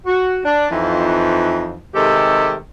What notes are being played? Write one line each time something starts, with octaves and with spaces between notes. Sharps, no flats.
F#4
D4
F2 E3 D#4
C3 D#3 G#3 A3 G4 A4